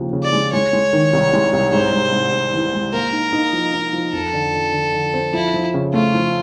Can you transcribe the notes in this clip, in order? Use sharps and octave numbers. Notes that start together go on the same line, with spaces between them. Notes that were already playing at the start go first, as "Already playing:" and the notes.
Already playing: D#2 C#3 F3
C#3
D5
G#3
G#3 C#5
G#3
D#3
C2
G#3
C2
G#2 C5
G#2
G#2
G#2
E3
G#3
A#3 A#4
D#4
D#4
F3
D#4
F3
F2 A4
D3
D3
D3
D3
C4
F3 E4
F3
C#3
A3 F4
F3